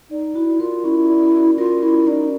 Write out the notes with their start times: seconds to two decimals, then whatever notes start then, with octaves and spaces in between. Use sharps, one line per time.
0.11 D#4 D5
0.35 E4 F#4
0.60 F4 A#4
0.84 C#4 E4
1.09 D5
1.34 F#4
1.58 F4 A#4
1.83 C#4 E4
2.07 D#4 D5